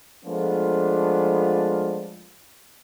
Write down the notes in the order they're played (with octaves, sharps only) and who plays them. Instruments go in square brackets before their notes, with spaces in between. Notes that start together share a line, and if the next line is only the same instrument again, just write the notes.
[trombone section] F3 G#3 A3 B3 D4 F4